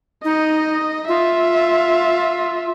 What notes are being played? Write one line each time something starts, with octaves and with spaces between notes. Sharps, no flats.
D#4 D#5
F4 E5